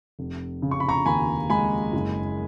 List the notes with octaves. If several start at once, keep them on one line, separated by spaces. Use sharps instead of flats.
F1
C#3
C#6
B5
A#5 C#6
D#2 G#5 B5
G#3 G#5 B5
F#1